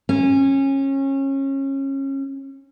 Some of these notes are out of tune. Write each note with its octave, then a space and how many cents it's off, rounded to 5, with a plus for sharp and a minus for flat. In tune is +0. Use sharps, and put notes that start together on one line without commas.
C#4 -25